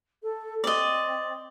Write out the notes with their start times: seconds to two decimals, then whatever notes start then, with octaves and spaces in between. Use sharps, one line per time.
0.23 A4
0.64 C4 D5 D#5